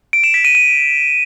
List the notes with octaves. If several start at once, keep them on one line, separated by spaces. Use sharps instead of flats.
D7
E7
B6
D#7
D#7